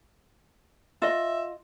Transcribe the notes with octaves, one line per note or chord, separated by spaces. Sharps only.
F4 D#5 E5